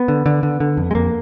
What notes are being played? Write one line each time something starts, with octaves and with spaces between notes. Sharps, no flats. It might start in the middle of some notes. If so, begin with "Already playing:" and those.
Already playing: B3
D3
D3
D3
D3
F2
G#3
F2 A#3